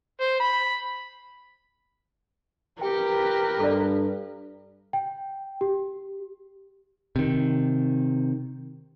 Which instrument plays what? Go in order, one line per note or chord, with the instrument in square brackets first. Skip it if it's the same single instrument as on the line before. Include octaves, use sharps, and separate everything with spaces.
[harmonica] C5
B5
[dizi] G4 [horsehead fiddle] A#4 B4 [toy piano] G5
[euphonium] G2 [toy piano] A4 D5
[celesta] G5
G4
[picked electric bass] C3 D#3